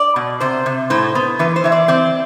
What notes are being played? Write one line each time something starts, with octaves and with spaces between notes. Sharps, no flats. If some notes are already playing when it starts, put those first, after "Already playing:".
Already playing: D5
B2
C3 C5
C3
A2 C5
B3
E3 B4
C5
E3 E5
D5
C4 D5